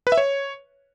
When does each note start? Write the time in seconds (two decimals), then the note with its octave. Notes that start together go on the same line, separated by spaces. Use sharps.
0.07 B4
0.12 E5
0.18 C#5